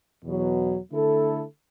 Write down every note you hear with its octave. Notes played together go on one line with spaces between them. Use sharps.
E2 B2 F#3
D3 A3 E4 A4